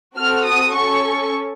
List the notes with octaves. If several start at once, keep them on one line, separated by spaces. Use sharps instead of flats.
C4 F#4 A4 F6
D#6
C#4 A4 C#6